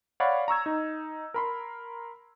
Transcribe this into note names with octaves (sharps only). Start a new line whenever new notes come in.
C#5 D5 F5 F#5 B5
A#5 C#6 E6 G#6
D#4
A#4 B5 C6